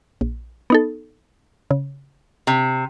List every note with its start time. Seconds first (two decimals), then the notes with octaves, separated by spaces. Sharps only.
0.21 A#1
0.70 B3 D#4 A4
1.71 C#3
2.47 C3